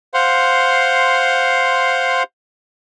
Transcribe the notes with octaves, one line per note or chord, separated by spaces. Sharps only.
C5 F5 F#5 C6